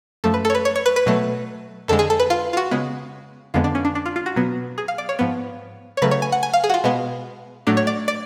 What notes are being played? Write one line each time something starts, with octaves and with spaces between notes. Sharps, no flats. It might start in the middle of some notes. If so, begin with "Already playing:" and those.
F#2 F3 A3 A4
B4
A4
C#5
B4
C#5
C#5
B4
B4
B2 F#3 A3
F2 D3 G#3 A4
G#4
A4
B4
F4
F4
F#4
C#3 G#3 B3
F2 D3 G#3 B3 F4
D4
C#4
D4
D4
F4
F4
F#4
B2 F#3 B3
G#4
F5
D5
C#5
G#2 F3 B3
C#5
C#3 F#3 A3 B4
C#5
G#5
F#5
G#5
F5
G#4
F#4
F4
B2 G#3 B3
A2 F#3 A3 D4
C#5
D5
D5